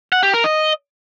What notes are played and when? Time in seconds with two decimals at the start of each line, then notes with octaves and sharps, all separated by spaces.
0.12 F#5
0.23 G4
0.34 A#4
0.44 D#5